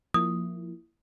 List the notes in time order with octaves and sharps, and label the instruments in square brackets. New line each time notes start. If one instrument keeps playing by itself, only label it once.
[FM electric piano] F3 A#3 E4 [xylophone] D#6